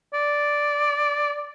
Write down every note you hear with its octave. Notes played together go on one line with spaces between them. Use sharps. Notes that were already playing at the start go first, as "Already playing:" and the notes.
D5